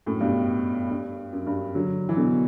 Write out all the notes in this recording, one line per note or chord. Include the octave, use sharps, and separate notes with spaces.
F#2 A2
G2 B2
G2
F#2
G2
D3 F#3
E3
B2 D3